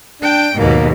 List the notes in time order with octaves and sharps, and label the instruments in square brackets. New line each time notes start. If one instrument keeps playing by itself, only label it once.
[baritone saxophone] D4 [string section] G5
[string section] D#2 G#2 B2 [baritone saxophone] A#3